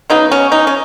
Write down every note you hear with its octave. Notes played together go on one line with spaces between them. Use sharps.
C#3 F#3 B3 D#4
C#4
D#4
C#4